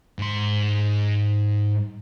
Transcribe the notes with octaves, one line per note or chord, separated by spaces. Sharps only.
G#2 C6